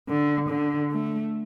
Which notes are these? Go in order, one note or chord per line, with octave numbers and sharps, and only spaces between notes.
D3
D3
A3